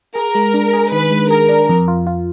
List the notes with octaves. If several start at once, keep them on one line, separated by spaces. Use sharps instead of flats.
G#4 A#4
G#3
D4
G#4
D#3 B4
G#3
G#4 A#4
D4
F2
F4
F4